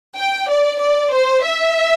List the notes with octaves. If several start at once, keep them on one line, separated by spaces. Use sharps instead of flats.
G5
D5
D5
C5
E5